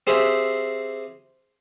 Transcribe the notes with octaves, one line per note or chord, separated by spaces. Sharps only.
C4 G4 G#4 C5 E5 F5